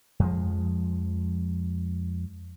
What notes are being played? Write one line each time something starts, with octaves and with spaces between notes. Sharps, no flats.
F2 F3 G#3